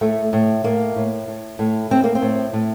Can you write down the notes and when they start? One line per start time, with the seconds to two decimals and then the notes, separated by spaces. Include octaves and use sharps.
0.01 A2 A3
0.33 A2
0.64 A2 A#3
0.96 A2
1.28 A2
1.59 A2
1.90 A2 C4
2.04 A#3
2.15 C4
2.22 A2
2.53 A2